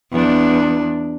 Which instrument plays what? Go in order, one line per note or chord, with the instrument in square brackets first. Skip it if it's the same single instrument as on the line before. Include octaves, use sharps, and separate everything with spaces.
[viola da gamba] E2 D4